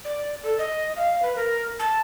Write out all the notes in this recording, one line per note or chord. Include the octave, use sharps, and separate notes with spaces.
D5
A4
D#5
F5
B4
A#4
A5